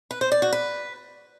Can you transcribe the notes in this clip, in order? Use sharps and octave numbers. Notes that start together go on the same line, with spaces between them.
B4
C5
D5
F#4
B4